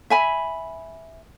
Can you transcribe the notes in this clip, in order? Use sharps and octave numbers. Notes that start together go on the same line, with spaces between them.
E5 G#5 B5